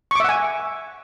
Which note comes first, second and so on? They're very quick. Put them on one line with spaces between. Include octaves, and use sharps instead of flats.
C#6 D6 E5 F#5 G#5